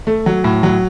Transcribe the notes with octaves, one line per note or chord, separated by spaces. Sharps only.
A3
F#3
A2
F#3